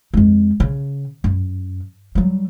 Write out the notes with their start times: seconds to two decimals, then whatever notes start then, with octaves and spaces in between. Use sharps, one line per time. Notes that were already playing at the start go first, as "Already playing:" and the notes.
0.14 F2 G#3
0.60 C#3
1.24 F#2
2.15 F#3 G3